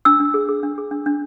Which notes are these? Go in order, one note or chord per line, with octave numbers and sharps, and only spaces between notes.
D4 E6
D4
G#4
G#4
D4
G#4
D4
D4